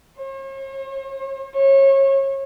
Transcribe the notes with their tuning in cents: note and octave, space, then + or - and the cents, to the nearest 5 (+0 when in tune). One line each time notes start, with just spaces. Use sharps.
C#5 -45
C#5 -30